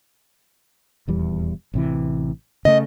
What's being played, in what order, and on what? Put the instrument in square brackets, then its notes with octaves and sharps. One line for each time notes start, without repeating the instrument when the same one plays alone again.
[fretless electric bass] D#1 E2 G3
A1 C3 E3
[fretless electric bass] C#3 A3 [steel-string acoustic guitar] D#5